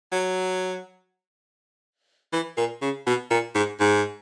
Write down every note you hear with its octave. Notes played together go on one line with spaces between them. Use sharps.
F#3
E3
A#2
C#3
B2
A#2
G#2
G#2